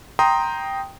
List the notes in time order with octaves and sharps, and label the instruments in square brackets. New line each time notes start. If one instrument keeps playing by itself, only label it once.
[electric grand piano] G5 A#5 C6 D#6